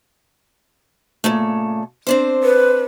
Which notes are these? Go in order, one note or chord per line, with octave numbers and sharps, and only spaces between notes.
A#2 C#3 A3
C4 D4 C5
B4